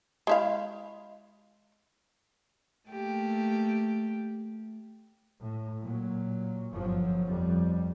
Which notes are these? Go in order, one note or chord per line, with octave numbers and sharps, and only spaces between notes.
G#3 E4 F5
A3 A#3 G4
A2
A#2 F#3
G1 F#2 F3 F#3
F2 G3